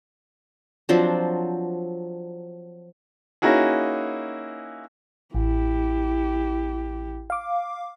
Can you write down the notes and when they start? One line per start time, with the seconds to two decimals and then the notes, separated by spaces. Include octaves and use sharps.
0.89 F3 F#3 C4 D4
3.42 A#3 C#4 D#4 E4 F#4 G#4
5.34 A1 E4 G4
7.30 F5 D6